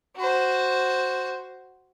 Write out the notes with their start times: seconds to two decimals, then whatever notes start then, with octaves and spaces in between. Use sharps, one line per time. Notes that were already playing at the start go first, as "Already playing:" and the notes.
0.16 F#4 C5